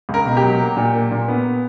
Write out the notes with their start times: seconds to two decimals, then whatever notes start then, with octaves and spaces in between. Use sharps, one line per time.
0.09 C#2
0.14 A#4
0.26 B2
0.37 G4
0.42 F#3
0.60 A#3
0.77 A#2
0.94 A#3
1.11 A#2
1.28 B3